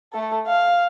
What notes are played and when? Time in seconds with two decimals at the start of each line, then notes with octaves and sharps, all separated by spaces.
0.13 A3 A4
0.47 F5